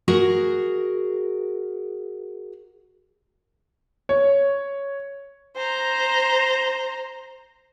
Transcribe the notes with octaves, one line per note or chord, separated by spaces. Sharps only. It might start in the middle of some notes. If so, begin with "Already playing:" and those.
F#4 G#4 A#4
C#5
C5 A#5